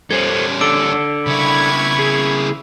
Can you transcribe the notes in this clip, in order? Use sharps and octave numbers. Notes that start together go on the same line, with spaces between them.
G3 C#4 A4 C5 G#6 F#7
D4 A4 D6 E6 D7
C#3 E4 B5 C#6 G#6
G#4